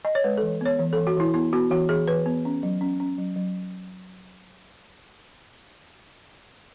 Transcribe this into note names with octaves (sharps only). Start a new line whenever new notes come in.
D#5
C#5
G#3 B4
E3 A4
B3 C#5
E3
E3 A4
F#4
E3 E4
B3 E4
B3 F#4
E3 F#4
E3 G#4
E3 B4
B3
C#4
F#3
C#4
C#4
F#3
F#3